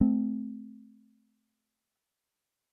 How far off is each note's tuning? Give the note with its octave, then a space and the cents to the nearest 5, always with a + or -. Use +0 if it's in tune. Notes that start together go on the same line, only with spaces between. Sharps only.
A3 -25 C4 -10